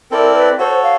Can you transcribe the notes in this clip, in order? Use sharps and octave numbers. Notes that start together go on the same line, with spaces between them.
C4 E4 A4 A#4 D5
B4
F#4 A4 C5 C#5
F5